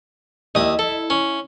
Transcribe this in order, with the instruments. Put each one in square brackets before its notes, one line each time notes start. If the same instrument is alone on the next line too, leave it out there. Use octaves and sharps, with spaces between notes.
[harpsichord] D#2 D#6 [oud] E4 D#5
[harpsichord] A4
C#4